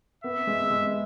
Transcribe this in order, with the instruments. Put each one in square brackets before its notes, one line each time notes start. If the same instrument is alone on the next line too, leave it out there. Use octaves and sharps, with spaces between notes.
[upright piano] B3 [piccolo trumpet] E5
[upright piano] G#3
G#3